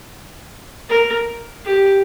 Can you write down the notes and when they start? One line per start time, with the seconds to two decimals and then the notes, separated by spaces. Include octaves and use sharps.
0.89 A#4
1.65 G4